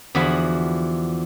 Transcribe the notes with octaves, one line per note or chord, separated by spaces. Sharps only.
E2 D3 F3 F#4 B5